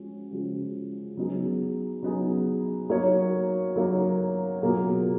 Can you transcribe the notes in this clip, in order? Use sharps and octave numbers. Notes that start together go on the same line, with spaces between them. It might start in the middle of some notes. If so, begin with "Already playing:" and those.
Already playing: F3 G#3 C#4 F#4
C#3 F3 G#3 C#4 F#4
F#3 B3 D#4 G#4
F#3 B3 D#4 G#4
F#3 A#3 D#4 F#4 C#5
F#3 A#3 D#4 F#4 C#5
B2 F#3 A#3 F4 G#4